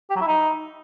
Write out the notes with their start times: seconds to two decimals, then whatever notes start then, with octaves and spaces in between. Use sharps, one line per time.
0.10 G4
0.16 F#3
0.21 E4
0.27 D#4